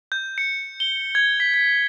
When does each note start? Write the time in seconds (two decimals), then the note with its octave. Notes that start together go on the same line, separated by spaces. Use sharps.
0.12 G6
0.38 C#7
0.80 G7
1.15 G#6
1.40 B6
1.54 B6